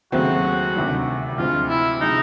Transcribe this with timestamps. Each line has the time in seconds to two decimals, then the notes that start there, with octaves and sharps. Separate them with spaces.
0.12 D#2 C#3 F#3 A3 C4 F#4
0.75 D2 C3 D#3 G3
1.38 D2 C3 F3 G#3 C4 F4
1.69 E4
2.01 C3 F3 G#3 D#4